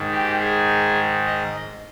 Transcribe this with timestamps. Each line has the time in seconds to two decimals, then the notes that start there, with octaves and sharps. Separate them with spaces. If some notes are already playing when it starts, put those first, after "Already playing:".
Already playing: G#2 D#3
0.12 G4
0.40 G#4
1.26 D#5